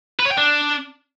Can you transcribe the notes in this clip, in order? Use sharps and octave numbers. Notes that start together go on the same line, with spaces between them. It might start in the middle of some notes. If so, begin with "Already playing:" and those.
B4
C#5
G5
D4